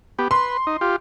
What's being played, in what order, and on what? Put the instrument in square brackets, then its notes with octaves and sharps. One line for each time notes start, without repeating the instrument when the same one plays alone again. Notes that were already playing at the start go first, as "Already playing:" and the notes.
[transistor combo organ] B3 G4
[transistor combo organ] B4 [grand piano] C6
[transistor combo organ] D#4
F4 G4